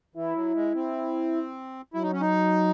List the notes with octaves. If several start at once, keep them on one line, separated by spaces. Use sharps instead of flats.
E3 E4
F#3
G#3
C4
F#3 E4
D#4
C#4
D#4